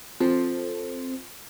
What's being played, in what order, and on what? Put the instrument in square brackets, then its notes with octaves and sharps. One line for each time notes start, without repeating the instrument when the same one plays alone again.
[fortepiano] F3 [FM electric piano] C4 A4 C5